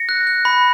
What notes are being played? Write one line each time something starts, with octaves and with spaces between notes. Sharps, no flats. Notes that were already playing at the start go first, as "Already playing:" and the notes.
Already playing: A#6 C#7
F#6
F#6
B5